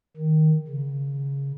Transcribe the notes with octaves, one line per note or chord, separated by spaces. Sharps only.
D#3
C#3